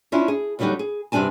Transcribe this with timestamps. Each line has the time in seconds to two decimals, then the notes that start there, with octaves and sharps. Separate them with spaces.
0.12 C#4 D4 E4 F4
0.28 G#4
0.59 D#2 D3 F#3 G3 D#4 G5
0.79 G#4
1.12 G2 C3 G3 D4 G#5 A5